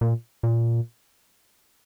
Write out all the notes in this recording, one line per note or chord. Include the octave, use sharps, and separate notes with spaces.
A#2
A#2